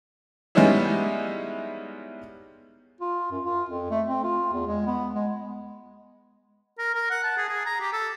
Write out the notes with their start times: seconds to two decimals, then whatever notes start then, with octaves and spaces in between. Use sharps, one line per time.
0.55 G3 G#3 B3 C#4 D#4 E4
3.00 F4
3.31 F#2
3.45 F4
3.69 F2
3.90 A3
4.08 C4
4.23 F4
4.53 E2
4.67 G#3
4.86 B3
5.15 G#3
6.79 A#4
6.94 A#4
7.10 F#5
7.24 A5
7.37 G#4
7.48 G#4
7.66 A#5
7.80 G4
7.93 A4